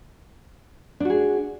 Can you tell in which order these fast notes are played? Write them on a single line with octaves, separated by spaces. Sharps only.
D4 F#4 G#4